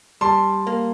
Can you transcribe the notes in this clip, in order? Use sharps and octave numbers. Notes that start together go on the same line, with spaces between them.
G3 A5 C6
A#3